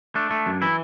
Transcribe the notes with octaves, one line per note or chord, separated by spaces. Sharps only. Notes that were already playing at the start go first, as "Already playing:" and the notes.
A3 D4
A3
F#2
E3 E4